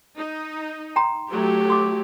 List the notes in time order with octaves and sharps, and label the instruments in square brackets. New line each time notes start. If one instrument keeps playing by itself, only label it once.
[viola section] D#4
[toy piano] G5 A#5 C6
[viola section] F#3 A3 [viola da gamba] G4
[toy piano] C6 D6